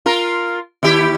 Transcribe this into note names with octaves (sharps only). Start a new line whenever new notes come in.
F4 A#4
D#2 E4 G4